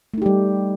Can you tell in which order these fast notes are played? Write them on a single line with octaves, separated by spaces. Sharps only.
A3 D#4 G4 G3